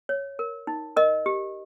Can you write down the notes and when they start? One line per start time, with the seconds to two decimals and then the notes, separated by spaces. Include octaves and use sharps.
0.09 C#5
0.39 A#4
0.67 D#4
0.97 A#4 D#5
1.26 G4